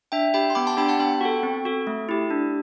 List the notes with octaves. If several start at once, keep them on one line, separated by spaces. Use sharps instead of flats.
D4 E5 G5
G4 G5 B5
C6
B3 B5 D6
A5 C6
D4 G4 G5 B5
F#5 A5
B3 G5 B5
F#4 A4
C4
F#4 A4
A3
E4 G4
D4